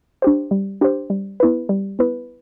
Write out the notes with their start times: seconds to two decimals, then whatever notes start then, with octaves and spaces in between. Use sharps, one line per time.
0.22 D4 G4 C5
0.51 G3
0.81 D4 G4 C5
1.10 G3
1.40 B3 E4 B4
1.69 G3
1.99 B3 E4 B4